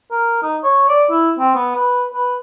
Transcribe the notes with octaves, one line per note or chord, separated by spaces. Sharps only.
A#4
D#4
C#5
D5
E4
C4
B3
B4
B4